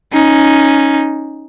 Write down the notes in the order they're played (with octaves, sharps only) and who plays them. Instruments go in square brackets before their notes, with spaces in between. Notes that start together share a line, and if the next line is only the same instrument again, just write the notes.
[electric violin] C#4 D#4